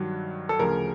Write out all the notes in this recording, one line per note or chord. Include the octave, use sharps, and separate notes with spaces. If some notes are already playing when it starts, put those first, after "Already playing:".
Already playing: G2 D#3 F#3
A4
D2 C#3 F3 A#4